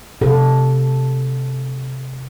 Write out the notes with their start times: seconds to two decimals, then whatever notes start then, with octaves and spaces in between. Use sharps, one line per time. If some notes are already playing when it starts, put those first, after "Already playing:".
0.21 C3 A4